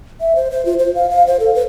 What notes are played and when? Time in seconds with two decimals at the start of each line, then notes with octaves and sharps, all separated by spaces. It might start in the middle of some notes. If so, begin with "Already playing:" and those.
0.21 E5
0.36 C5
0.51 C5
0.65 F4
0.79 C5
0.95 F5
1.10 F5
1.27 C5
1.40 A4
1.55 B4